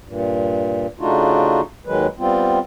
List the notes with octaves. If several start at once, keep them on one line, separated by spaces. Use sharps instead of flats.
G2 A#2
C#3 A3 D4 D#4 F4 F#4
D#2 D#3 F#3 G#3 B4
G3 B3 C4 F4